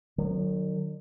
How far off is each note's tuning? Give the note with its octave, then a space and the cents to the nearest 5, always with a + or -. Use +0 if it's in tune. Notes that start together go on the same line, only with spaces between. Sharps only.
D#3 -45 F#3 +0